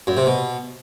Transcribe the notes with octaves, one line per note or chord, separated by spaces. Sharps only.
F#2
C3
B2